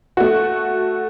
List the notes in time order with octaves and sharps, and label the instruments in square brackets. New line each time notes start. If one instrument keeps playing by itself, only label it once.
[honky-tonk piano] A3 F#4